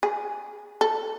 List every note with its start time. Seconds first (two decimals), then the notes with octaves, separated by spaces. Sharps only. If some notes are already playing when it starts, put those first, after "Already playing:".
0.03 G#4
0.81 A4